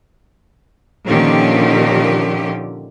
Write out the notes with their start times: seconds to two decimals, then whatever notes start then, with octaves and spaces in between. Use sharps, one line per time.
1.07 A#2 D3 D#3 F3 C#4 G4